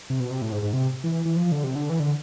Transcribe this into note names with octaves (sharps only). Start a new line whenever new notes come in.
C3
B2
C3
A2
G#2
G#2
C3
E3
E3
F3
D3
C3
D3
E3
D3